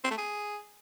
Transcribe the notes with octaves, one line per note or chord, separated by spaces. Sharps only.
C4
A3
G#4